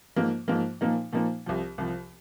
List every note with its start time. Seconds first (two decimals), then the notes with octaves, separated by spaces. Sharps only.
0.16 G#2 F3 A#3
0.48 G#2 F3 A#3
0.81 A#2 F3 A#3 D#4
1.13 A#2 F3 A#3 D#4
1.46 C2 C3 F3
1.78 C2 C3 F3